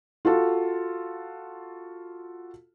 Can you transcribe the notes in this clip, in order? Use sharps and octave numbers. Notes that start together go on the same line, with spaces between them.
F4 F#4 A4